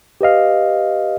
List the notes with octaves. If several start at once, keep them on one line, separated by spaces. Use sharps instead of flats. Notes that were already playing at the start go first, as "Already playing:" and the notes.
G4 B4 D#5 F5